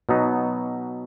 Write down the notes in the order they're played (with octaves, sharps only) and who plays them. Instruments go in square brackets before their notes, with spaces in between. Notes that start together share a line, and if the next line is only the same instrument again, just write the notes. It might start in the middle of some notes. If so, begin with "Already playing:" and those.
[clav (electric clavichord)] B2 F#3 B3 D#4